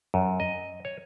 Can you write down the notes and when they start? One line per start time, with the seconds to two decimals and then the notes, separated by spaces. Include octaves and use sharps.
0.14 F#2
0.40 D#5
0.85 C#5